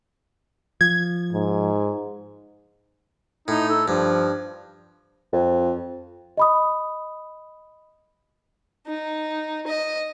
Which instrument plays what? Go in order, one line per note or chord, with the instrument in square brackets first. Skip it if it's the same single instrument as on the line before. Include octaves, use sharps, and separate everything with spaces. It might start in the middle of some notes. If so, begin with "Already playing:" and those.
[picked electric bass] F3 [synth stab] G#6
[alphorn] G#2
[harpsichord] A2 [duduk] D#4
[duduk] A4
[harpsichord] G2 [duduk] F3
[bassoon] F2
[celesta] D#5 B5 D#6
[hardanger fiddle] D#4
D#5